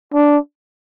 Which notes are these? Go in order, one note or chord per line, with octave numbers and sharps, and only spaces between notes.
D4